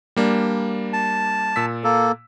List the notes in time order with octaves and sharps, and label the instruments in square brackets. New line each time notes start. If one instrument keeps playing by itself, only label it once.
[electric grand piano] G3 A#3 D4
[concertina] A5
[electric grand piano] A#2 E6 B6
[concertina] A#3 A4